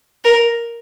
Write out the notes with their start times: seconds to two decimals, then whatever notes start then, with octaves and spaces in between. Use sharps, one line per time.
0.25 A#4